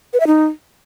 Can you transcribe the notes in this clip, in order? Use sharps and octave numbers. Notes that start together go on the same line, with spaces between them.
B4
E5
D#4